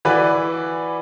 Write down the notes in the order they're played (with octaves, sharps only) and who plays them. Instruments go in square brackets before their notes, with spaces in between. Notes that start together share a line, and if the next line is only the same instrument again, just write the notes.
[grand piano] E3 E4 F#4 B4 D5